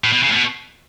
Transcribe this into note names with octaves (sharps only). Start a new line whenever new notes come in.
A2
B2
C#3
A2
B2